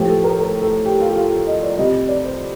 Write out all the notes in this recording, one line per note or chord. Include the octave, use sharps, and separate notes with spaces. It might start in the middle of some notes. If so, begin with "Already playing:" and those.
Already playing: A2 F3 A3 G4
A4
A#4
A#4
A4
G4
F4
G4
F4
D#5
D5
C3 G3 D#5
D5
C5